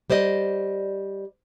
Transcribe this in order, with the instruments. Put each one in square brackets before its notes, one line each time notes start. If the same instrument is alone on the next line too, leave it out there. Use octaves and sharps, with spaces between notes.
[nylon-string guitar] G3 C5 D5 D#5